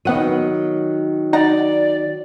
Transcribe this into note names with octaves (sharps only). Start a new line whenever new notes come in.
D#3 F#3 B3 F#5 D#7
D#4 D5 F#5 A#5